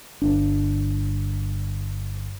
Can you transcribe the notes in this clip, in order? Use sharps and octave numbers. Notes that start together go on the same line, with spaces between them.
G1 D4